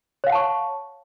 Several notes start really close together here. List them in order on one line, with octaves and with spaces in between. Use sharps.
C#5 F5 F#5 A5 C#6